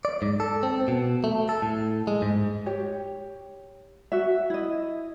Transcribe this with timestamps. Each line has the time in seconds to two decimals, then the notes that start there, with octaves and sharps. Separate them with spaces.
0.05 D5
0.22 G#2
0.40 A4
0.63 C4
0.88 B2
1.24 A3
1.49 A4
1.62 A2
2.07 G#3
2.22 G#2
2.66 G4 C#5
4.12 F#4 E5
4.50 E4 D#5